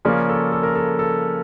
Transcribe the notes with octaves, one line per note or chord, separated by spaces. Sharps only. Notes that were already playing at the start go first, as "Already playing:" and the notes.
C#3 F3 A#3 C#4 D5
A4
A4
A#4
A4
A4